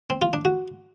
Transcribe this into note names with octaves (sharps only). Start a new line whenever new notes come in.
C4
F4
D4
F#4